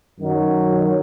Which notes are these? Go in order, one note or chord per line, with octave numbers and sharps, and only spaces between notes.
F#2 D#3 F#3